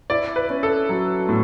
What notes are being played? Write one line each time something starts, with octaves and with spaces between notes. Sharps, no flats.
E4 D5
B4
C#4
A4
F#3
A2